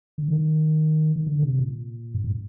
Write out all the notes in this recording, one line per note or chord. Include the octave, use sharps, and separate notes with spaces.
D3
D#3
D#3
D3
C3
A#2
G2
A2